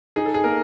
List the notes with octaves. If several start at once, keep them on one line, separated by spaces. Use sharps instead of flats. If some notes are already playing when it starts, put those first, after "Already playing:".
D#4 G#4
A4
G#4
A#3 A#4